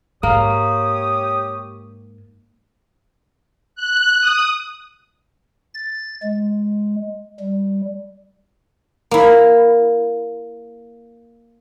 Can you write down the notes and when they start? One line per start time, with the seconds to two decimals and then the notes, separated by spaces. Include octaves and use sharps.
0.23 G#2 A#3 G4 C#5 D#6
3.75 F#6
4.20 D#6
5.74 A6
6.23 G#3
7.40 G3
9.11 A#3 E4